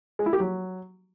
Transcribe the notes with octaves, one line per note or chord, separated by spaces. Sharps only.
G#3
E4
G4
F#3